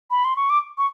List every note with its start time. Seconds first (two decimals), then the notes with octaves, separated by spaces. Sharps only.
0.11 B5
0.25 C6
0.36 C#6
0.50 D6
0.78 C#6